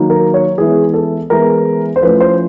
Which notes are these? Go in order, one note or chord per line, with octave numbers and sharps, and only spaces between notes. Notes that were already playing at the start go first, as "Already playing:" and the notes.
Already playing: D#3 F#3 A#3 D#4
A#4
C#5
E3 G#3 B3 E4 G#4
A4
E3 G#3 B3 E4 A#4
C5
F3 A3 C#4 E4 B4
C5